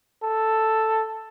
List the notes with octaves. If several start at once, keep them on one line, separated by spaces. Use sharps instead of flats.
A4